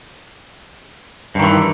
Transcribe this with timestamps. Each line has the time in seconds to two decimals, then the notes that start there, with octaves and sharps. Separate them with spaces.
1.35 G2
1.39 D#3
1.43 E3